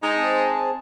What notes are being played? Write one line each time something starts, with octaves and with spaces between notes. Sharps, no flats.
G#3 D#4
C4 G#4 A5